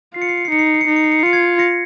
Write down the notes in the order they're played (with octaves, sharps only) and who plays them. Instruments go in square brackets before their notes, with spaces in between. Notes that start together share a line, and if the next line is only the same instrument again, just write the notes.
[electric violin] F4 [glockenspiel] C7
[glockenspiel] C#7
C7
C#7
C7
[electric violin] D#4 [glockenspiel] C#7
[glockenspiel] C7
C#7
C7
C#7
[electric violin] D#4 [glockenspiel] C7
[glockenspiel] C#7
C7
C#7
C7
[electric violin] F4 [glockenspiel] C#7
[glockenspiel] G#6 C7
A#6 C#7